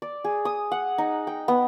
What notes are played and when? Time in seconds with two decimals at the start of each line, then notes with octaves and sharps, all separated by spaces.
0.02 D5
0.24 G#4
0.45 D#6
0.72 F#5
0.98 D#4
1.27 G5
1.48 B3